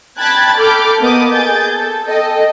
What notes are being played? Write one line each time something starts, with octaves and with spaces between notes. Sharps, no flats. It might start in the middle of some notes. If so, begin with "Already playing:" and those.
G5 A5 B5 F#6 G#6 A6
A4 B5 D6 F6 G6
A#3 B3 D#5 A5 D6 D#6
G#4 G6 A6
A4
A4 D#5 G5